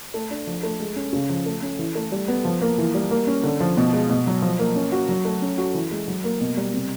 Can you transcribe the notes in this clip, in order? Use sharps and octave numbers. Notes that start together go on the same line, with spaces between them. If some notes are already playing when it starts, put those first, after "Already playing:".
A3
D4
F3
A3
G#3
C#4
C#3
F3
A3
C#4
E3
A3
G3
B3
F3
A#3
E3
G3
A#3
C#4
D3
F3
B2
G#3
B2
F#3
F3
A#3
C#4
F#4
F#3
A3
C#4
F#4
E3
G#3
F#3
A#3
B2
G3
C3